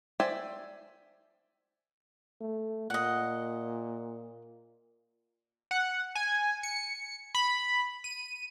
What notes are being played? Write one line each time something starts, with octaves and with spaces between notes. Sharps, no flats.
C5 D5 E5 G5 G#5
A3
A#2 D#5 F#5
F#5
G#5
C#7
B5
D#7